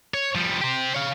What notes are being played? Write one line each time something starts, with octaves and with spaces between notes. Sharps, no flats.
C#5
F3 G3
G4 C5
C#5 F5